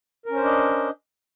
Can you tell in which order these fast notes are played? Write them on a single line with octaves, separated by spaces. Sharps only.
A#4 C#4 C5 D4 D#5